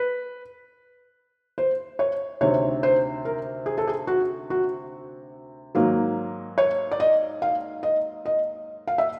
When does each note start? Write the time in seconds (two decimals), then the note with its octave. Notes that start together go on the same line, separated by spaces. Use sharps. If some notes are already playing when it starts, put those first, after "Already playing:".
Already playing: B4
1.58 C5
1.99 C#5
2.41 D2 C3 D#3 C#5
2.83 C5
3.25 A#4
3.66 G#4
3.78 A4
3.87 G#4
4.07 F#4
4.50 F#4
5.75 G#2 D#3 F#3 A#3
6.58 C#5
6.91 D5
7.00 D#5
7.42 F5
7.83 D#5
8.26 D#5
8.87 F5
8.98 E5